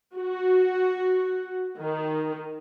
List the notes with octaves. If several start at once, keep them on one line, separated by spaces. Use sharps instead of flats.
F#4
D#3